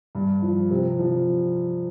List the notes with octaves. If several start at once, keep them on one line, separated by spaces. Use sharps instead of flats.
G2
F3
C3
F3